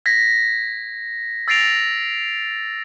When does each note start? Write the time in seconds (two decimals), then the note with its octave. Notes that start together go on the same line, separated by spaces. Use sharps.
0.06 G#6 A#6 B6
1.48 E6 A6 A#6 C7 D7 F7